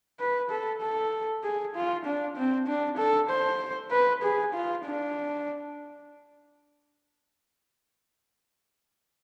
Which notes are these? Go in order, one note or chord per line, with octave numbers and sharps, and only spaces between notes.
B4
A4
A4
G#4
F4
D4
C4
D4
A4
C5
B4
G#4
F4
D4